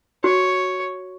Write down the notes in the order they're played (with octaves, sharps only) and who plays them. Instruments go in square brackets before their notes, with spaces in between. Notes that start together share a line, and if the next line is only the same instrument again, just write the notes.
[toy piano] F#4 [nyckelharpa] C#5